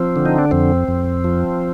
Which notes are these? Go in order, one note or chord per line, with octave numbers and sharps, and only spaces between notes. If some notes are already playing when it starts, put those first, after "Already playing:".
Already playing: F3 C4
D3
D#4
D4
F2 C4
F2
F3